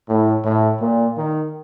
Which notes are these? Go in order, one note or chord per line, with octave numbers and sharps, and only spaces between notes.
A2
A2
A#2
D#3